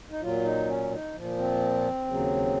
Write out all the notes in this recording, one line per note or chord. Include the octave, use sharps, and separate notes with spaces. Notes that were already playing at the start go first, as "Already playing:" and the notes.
D#4
A#2 F#3 F4
D#4
C#4
D#4
A#2 F3
C4
D#2 C#3 F#3